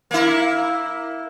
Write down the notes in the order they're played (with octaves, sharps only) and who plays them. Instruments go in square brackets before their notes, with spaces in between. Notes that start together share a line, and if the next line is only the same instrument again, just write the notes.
[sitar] A#3 E4